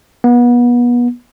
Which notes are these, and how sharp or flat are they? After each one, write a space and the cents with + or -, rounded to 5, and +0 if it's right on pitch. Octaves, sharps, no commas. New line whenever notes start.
B3 -30